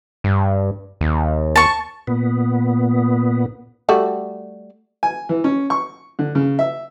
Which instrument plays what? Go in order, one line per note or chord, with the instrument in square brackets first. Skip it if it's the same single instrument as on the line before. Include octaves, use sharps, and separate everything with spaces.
[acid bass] G2
D#2
[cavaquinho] A5 C#6
[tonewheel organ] A#2 B3
[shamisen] G3 A3 F#4
[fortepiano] G#5
E3
C#4
C#6
D3
C#3
E5